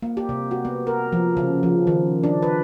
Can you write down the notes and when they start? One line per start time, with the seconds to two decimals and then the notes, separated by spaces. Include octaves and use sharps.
0.02 A#3
0.17 G4
0.29 C3
0.51 F#4
0.65 B3
0.87 A#4
1.12 F3
1.37 C#3
1.63 F3
1.87 D#3
2.23 D4
2.42 B4